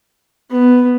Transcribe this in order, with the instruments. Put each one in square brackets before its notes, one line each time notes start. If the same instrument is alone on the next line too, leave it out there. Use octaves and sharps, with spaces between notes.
[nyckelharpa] B3